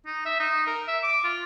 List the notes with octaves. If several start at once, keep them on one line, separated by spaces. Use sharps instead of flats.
D#4
E5
D#4
A#4
E5
D6
F4